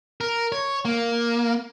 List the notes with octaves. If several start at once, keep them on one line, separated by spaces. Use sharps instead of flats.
A#4
C#5
A#3